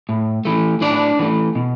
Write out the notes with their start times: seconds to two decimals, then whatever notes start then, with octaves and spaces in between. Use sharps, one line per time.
0.09 A2
0.45 E3 A3
0.81 A2 D4 D5
1.19 E3 A3
1.55 B2